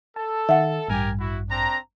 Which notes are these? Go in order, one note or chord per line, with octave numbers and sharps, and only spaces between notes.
A4 A5
D#3 E5 F#5
A1 G2 G4 A#4 G#5
E4 F#4
C4 D4 A#5